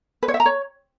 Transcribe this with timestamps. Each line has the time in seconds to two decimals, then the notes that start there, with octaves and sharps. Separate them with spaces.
0.23 B4
0.28 C#5
0.34 E5
0.40 A#5
0.46 C#5